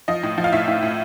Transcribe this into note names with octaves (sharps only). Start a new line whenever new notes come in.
F3 D#5
A2
F3
F5
A2 E5
A2
A2